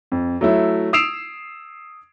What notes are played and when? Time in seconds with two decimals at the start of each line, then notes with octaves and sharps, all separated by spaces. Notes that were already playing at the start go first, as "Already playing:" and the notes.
0.12 F2
0.41 F#3 A3 E4
0.93 D#6 E6 C7 D7 E7 F7